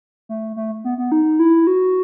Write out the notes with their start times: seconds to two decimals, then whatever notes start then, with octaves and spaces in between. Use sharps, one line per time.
0.29 A3
0.56 A3
0.84 B3
0.98 B3
1.12 D#4
1.39 E4
1.67 F#4